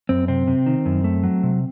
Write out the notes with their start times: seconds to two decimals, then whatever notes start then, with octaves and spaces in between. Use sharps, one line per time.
0.09 F#2 C4
0.28 C3 C4
0.47 C3
0.66 D#3
0.86 F#2
1.04 A3
1.24 F#3
1.43 C3